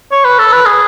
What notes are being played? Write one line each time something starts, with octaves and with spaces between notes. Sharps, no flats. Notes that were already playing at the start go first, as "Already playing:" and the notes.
C#5
B4
A4
B4
G#4